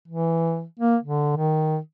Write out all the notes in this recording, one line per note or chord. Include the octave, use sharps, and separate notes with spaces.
E3
A#3
D3
D#3